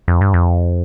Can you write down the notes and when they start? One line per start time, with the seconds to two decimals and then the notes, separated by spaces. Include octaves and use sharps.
0.08 F2
0.21 G2
0.34 F2